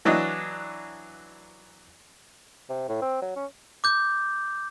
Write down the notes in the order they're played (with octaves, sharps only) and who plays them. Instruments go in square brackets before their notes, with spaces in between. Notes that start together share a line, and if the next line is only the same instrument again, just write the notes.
[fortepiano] E3 F#3 D4 D#5
[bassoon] C3
A2
C4
F#3
C#4
[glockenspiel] D6 G6